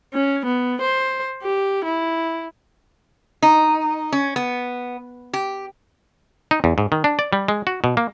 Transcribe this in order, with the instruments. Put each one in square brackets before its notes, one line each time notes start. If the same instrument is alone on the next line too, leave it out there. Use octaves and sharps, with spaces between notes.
[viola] C#4
B3
C5
G4
E4
[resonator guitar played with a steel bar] D#4
C#4
B3
G4
[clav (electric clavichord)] D#4
E2
G#2
D#3
D4
D5
G3
G#3
F#4
B2
A#3